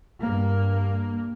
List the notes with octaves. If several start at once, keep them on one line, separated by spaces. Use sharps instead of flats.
G2 A#3